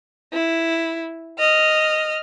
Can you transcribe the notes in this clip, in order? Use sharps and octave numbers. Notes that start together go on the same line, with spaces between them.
E4
D#5 F6